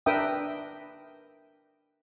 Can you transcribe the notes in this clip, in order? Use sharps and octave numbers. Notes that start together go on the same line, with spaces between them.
D4 A#4 B4 E5 G5 D#6